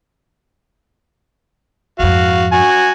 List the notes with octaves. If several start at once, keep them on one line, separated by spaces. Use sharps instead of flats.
F2 G#2 F#4 F5
F#4 G#5